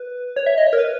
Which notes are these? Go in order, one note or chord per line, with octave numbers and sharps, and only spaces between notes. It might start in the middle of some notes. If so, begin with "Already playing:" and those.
Already playing: B4
C#5
E5
D#5
C#5
A#4
B4